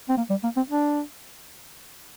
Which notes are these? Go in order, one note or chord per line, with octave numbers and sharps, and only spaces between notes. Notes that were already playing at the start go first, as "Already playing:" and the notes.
C4
A#3
G3
A#3
C4
D4